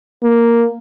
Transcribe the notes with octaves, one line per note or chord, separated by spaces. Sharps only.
A#3